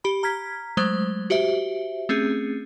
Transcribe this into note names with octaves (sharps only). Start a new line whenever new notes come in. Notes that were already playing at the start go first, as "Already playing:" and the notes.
G4 B5
A#5 F6 G#6 B6
F#3 G#3 A3 C5
F#4 G4 C5 E5
A3 C4 C#4 G#4